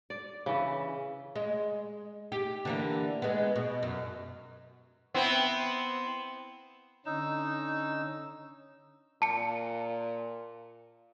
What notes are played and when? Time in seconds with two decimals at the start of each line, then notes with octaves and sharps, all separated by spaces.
0.10 D5
0.46 C#3 E3
1.36 G#3
2.32 G4
2.65 D3 E3 A#3
3.22 G#3 B3
3.56 B2
3.83 F#2
5.14 B3 C4 E4
7.06 D3 C#4 D#4 E6
9.22 A#2 A5 C#7